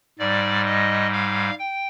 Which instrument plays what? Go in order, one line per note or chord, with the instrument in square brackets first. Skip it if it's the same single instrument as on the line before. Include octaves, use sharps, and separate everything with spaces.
[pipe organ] G#2 G3 D5
D#5
F5
G5